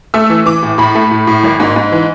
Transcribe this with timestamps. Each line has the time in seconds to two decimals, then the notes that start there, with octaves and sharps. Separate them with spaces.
0.14 A3 E6
0.30 E3
0.46 E3 D6
0.62 A2
0.78 A2 B5
0.95 A3
1.11 A2
1.27 A2
1.43 G#1
1.60 G#2
1.76 G#2
1.92 E3